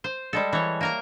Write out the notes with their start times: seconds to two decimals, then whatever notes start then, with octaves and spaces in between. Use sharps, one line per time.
0.04 C5
0.33 G3 G#3 A4
0.53 E3 C#5
0.81 A#3 A#4 A#5